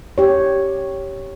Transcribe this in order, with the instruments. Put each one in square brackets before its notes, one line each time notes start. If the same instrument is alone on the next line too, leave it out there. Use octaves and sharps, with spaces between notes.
[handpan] G4 C#5